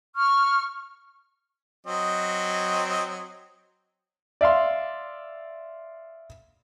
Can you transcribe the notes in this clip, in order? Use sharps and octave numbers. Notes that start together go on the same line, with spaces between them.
C#6 F6
F#3 C4 D#5
D5 E5 F5 C6